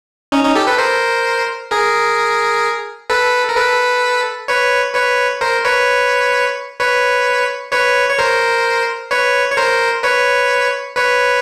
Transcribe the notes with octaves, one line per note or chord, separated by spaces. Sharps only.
C#4 D#4
C#4 D#4
G4 A4
A4 B4
A#4 C5
G#4 A#4
A4 B4
A#4
A4 B4
B4 C#5
B4 C#5
A#4 C5
B4 C#5
B4 C#5
B4 C#5
C#5
A#4 C5
B4 C#5
C#5
A#4 C5
B4 C#5
B4 C#5